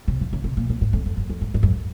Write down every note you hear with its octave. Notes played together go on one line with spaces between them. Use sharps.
C3
F3
C#3
C3
A#2
A#2
G#2
F2
F2
F#2
F2
G#2
G#2
F#2